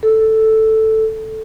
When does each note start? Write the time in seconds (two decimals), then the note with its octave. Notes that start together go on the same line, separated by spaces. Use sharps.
0.03 A4